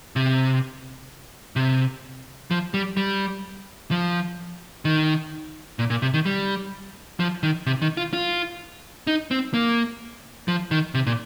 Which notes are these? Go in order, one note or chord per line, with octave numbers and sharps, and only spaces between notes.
C3
C3
F3
G3
G3
F3
D#3
A#2
A#2
C3
D#3
G3
F3
D#3
C3
D#3
F4
F4
D#4
C4
A#3
F3
D#3
C3
A#2